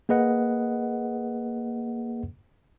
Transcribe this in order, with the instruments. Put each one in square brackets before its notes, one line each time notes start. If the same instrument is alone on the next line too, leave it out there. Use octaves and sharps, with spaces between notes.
[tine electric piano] A#3 G#4 B4 D#5 F#5